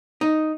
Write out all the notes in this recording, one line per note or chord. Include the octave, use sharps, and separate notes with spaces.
D#4